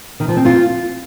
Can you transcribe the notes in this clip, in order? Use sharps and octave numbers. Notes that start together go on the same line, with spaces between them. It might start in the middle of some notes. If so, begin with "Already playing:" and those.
D#3
F3
C4
F4